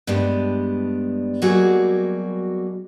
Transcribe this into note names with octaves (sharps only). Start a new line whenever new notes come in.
G2 G3 G#3 B3 D4
B2 F#3 G3 A#3 F#4 G#4